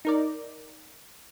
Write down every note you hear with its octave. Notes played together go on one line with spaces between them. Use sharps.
D#4 A#4 D5